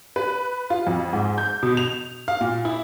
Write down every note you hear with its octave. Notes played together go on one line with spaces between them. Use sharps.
B4
F4
F2
G#2
G6
B2
F7
F5
A#2
E4